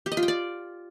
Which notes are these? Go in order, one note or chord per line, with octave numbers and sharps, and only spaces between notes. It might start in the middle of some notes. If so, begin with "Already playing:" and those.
G4
D#5
F4
G5
D5